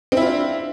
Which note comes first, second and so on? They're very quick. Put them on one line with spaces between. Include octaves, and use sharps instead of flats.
C4 E4 F4 D4